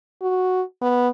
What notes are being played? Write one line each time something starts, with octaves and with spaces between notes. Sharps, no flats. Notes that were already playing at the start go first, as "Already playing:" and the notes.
F#4
B3